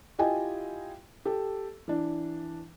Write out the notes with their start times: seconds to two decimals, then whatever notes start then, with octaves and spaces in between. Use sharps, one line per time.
0.19 E4 F4 G4 D#5 G5 G#5
1.25 G4 A4
1.88 E3 D4